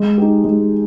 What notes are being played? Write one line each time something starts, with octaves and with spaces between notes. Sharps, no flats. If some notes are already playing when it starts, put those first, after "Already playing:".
Already playing: G#3
D#4 G4
G#3